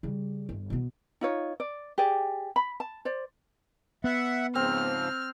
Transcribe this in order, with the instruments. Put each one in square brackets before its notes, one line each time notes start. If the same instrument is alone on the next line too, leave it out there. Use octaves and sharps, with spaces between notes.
[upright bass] C#3 G3
G1
B2 B3
[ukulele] D#4 F4 C#5
D5
G4 G#4 D5
B5
A5
C5 D5
[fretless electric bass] B3 [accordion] E5 F#5
[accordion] G#2 C#3 F3 [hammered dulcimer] C4 [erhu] F6